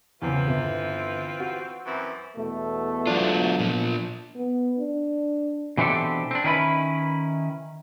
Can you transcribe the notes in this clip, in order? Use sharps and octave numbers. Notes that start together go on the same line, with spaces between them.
E2 C#3 E3 C4 F4
G1
F#4
F#2 E3 C4
E2 B2 A3
F#3 B3 D4 F4
A#2 F3
B3
D4
B2 E3 C4 D4 G4 A4
C4 D4
D#3 C#4 E4 B4